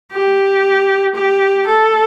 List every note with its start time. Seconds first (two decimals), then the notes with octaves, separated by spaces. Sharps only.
0.12 G4
1.15 G4
1.67 A4